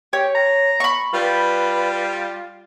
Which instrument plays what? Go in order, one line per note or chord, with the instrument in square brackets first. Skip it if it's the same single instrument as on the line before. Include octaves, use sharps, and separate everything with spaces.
[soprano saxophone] G4 [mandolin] C#5
[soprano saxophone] A#5
[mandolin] B5 C#6
[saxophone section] G3 F4 D5 [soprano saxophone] B4